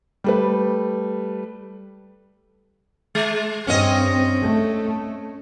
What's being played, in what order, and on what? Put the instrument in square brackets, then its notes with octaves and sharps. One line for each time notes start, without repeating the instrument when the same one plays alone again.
[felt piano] G3 A3 B4
[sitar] G#3
[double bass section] G2 C4 [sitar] C#4 D#5
[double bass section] A3